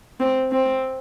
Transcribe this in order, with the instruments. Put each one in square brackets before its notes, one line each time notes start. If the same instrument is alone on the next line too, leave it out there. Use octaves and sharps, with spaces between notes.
[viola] C4
C4